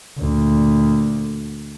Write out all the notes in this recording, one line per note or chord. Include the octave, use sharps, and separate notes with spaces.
D2 A#2